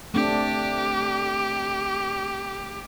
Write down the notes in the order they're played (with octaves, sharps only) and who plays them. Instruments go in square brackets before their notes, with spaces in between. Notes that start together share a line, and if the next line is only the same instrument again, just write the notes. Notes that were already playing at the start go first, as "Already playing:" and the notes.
[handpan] A3 C4 D4 [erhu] G4